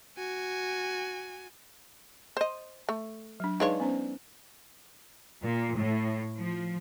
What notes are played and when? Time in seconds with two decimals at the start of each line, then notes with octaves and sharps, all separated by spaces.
0.17 F#4 G#5
2.37 C5 D#5
2.89 A3
3.40 F#3 D4
3.60 G#3 D4 D#4 B4 C#5 F5
3.80 B3 C#4 C5
5.42 A#2
5.76 A2
6.36 F3